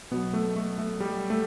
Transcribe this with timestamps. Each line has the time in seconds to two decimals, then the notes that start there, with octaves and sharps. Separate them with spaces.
0.11 B2 F#3 B3
0.33 A3
0.56 A3
0.78 A3
1.00 G3
1.30 A3